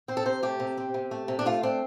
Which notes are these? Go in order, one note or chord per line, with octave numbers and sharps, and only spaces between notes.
C4 C5
A4
C3 C5
A3 G4
C3
C4
C3
A3
C3
D4
A3 F4
C4 D4